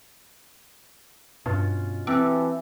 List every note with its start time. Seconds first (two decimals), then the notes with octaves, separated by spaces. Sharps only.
1.46 G2 B2 C#4 F4
2.07 E3 C4 F#4 G4 A4